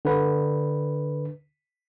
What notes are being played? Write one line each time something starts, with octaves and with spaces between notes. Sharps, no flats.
D3 B4